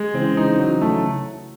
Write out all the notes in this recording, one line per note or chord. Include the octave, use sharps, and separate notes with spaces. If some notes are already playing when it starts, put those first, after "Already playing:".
Already playing: G#3
C#3 E3 C4
D#4
F#3
A3